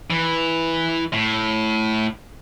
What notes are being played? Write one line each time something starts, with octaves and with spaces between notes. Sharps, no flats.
E3
A2